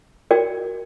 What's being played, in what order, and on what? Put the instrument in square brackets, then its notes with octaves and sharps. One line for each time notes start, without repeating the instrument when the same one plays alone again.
[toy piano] F#4 A#4 D5 G5